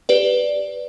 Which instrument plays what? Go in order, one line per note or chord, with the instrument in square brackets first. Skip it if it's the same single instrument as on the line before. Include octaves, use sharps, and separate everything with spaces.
[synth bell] G4 B4 D5